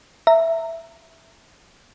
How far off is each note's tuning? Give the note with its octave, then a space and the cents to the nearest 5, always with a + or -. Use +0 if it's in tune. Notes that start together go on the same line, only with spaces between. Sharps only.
E5 +0 A#5 -20